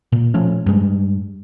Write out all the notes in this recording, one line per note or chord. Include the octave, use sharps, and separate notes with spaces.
A#2
F3 A3 C#4
G2 G#3